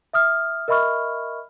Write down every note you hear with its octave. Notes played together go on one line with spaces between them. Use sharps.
E5 D#6 F6
A#4 D#5 E5 B5 C#6 F6